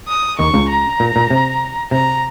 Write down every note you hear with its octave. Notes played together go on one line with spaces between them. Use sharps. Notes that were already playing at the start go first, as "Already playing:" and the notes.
D#6
D#2 D#3 C#6
C#2 C#3
A#5
A#2
A#2
C3
C3 A#5